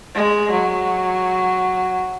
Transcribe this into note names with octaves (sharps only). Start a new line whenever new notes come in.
G#3
F#3